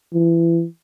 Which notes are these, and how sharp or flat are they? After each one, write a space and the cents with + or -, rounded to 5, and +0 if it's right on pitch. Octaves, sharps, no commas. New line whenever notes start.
E3 +25